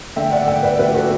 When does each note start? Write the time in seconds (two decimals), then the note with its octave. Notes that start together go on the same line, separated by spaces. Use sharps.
0.16 D3 A3 E5 G5
0.32 D5 F#5
0.48 E5 G5
0.63 B4 D5
0.79 D3 A3 G4 B4
0.94 F#4 A4